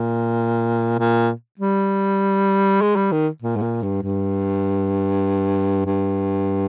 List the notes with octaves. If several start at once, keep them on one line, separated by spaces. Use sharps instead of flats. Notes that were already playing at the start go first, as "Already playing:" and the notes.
Already playing: A#2
A#2
G3
G#3
G3
D#3
A#2
G#2
A#2
G2
G2
G2